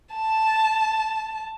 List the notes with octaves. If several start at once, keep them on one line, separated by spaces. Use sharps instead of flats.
A5